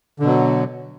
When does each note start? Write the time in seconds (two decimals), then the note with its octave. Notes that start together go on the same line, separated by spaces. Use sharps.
0.20 D3
0.23 B2
0.26 F#3